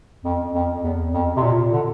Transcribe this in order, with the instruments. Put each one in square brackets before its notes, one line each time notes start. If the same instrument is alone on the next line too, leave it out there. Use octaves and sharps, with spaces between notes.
[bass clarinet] F2
F2
E2
F2
C3
A#2
D3